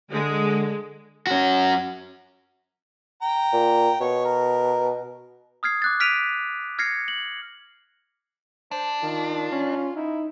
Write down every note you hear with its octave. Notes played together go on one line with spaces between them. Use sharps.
D3 G#3
C#4 F#4
G5 A#5
A#2
B2 C#5
A#4
D#6 F6 G#6 C7
D6 F#6 A6
F6 B6 D7 D#7 F7
F6 G#6 A#6 C7 C#7
F#7
D4 C5
D#3 F4
C#4
D#4 E4